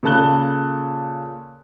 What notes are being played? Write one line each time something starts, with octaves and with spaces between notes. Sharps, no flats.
A#2 C#3 A4 A5 F#6 G7